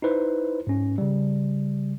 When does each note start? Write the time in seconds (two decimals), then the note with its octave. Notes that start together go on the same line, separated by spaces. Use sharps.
0.02 D#4 E4 B4 C5
0.67 G#2 C#4
0.98 C#3 G3